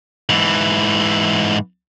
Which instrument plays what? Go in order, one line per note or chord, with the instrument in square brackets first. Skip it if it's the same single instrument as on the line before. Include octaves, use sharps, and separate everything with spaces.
[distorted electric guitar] G#2 E3